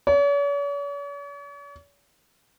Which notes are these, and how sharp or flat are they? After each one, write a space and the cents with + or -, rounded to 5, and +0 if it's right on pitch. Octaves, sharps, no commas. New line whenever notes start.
C#5 +45